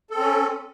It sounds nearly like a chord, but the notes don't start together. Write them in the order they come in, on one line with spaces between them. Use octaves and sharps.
A4 C4 C#4